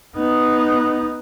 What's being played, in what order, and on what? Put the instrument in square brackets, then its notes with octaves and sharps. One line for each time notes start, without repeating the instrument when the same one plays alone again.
[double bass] B3 D#4